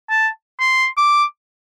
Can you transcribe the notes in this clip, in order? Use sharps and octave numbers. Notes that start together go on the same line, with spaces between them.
A5
C6
D6